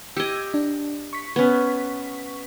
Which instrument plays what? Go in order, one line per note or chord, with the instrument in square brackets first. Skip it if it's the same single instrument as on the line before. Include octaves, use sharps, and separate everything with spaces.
[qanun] G4 D#5 [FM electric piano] E6 G6 G#6
[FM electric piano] D4
C#6 B6
[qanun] B3 C#4